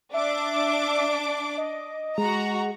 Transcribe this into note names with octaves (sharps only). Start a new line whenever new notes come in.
D4 E5 D6
D#5
G#3 F#4 A#5